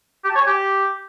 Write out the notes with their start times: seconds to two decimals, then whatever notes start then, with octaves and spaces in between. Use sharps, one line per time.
0.24 G4
0.30 A5
0.35 C#5
0.41 G#5
0.46 G4